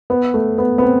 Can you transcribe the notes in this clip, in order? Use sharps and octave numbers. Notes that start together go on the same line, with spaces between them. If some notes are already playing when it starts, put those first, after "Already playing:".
B3
A3
B3
B3
C4